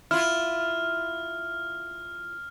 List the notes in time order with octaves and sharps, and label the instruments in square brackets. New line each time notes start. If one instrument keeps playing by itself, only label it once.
[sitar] E4 F4 [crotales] F6